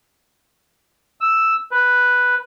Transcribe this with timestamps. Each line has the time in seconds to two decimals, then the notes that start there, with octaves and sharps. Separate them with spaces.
1.21 E6
1.71 B4